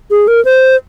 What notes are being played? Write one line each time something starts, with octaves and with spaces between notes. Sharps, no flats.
G#4
A#4
C5